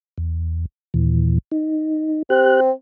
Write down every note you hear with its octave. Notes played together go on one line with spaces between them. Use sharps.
E2
D#2 A#2 E3
D#4
C4 G4 F#6